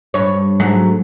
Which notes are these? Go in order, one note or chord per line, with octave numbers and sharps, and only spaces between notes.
G2 C#5
G#2 F#3 A3